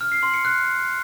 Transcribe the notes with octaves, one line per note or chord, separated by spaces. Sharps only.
F6
C7
C6
C#7
F#6